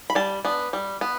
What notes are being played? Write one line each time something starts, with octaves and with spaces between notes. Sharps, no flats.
B5
G3 A5
B3 D4
G3
B3